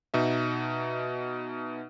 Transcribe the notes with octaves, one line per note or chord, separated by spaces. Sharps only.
B2 D#4 E5